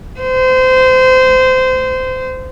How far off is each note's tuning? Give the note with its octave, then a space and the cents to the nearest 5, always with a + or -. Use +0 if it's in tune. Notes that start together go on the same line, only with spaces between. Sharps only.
C5 -25